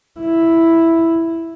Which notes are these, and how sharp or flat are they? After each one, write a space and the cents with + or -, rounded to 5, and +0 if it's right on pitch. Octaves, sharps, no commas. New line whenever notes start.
E4 +0